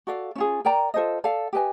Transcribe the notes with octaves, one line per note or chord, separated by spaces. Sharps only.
F#4 A4 D5 F5
C#4 F4 G#4
A#4 D5 G5 A#5
F4 A4 C5 D#5
A4 D5 F5
G4 B4 D#5 G#5